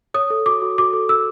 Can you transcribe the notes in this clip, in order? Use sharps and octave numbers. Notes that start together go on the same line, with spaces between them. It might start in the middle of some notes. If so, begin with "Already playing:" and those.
C#5 D#6
A4
F#4 D6
F#4
F#4 D6
A4
A4 E6